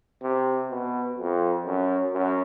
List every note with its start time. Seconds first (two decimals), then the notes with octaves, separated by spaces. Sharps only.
0.22 C3
0.70 B2
1.18 F2
1.66 F#2
2.13 F#2